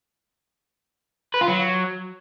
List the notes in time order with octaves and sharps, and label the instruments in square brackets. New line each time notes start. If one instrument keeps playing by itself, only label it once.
[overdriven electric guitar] B4
F4
F#3